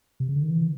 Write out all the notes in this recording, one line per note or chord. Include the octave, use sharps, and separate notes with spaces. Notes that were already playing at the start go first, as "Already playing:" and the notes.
C3
C#3
D3
D#3
E3